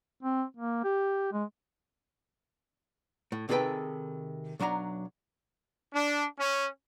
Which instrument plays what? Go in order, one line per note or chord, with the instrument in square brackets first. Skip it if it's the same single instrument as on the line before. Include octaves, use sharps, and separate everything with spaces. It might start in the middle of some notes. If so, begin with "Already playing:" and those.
[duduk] C4
A#3
G4
G#3
[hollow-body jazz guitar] A2
C3 D#3 G#4 A4 B4 G5
B1 F#3 D4 E5 A#5
[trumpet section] D4
C#4